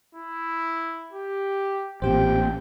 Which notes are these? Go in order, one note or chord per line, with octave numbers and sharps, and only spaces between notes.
E4
G4
A1 A#2 C4 G4 C5 G5